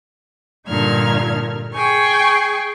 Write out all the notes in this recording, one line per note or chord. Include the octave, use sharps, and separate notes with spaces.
G2 A#2 D3 D#4 F6 G#6
G#4 G5 G#5 C#6